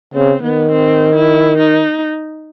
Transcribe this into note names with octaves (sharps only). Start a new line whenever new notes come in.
C#3 C4
D#3 B3
C4
E4
D#4